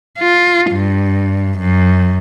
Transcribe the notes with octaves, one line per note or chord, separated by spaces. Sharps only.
F4
G2
F#2